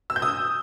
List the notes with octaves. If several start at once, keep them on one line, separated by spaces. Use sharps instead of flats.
E6
G6
D#6